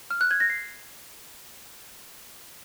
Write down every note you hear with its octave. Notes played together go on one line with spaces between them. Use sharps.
F6
F#6
G#6
A#6
C7